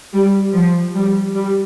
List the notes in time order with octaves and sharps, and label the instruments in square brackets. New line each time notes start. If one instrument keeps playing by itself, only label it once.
[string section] G3
F3
G3
G3